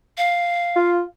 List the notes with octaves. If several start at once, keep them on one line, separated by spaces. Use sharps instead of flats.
F5
F4